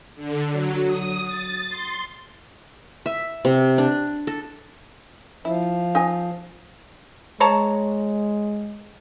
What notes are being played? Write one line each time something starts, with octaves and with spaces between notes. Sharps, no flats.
D3
F#3
D#6
A6
C6
E5
C3
D4
A4
F3 E4
D#4 G#5
G#3 C#5 A5 A#5